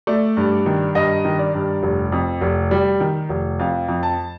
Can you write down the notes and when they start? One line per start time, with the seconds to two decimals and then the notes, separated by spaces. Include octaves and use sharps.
0.07 A3 D5
0.37 G2
0.66 D#3
0.95 G2 D#5
1.25 D#3
1.39 D5
1.54 G2
1.83 F1
2.12 F2
2.41 F1
2.71 G3
3.00 D#3
3.29 F1
3.59 F2 F5
3.88 F2
4.03 A5